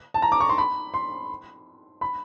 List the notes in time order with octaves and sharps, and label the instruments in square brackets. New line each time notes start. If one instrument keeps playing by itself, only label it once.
[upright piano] A5
A#5
D6
C#6
C6
B5
C6
B5